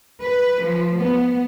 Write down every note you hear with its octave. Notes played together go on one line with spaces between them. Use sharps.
B4
F3
B3